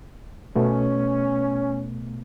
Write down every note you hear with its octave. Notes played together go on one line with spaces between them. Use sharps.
B2 A3 B3 C#4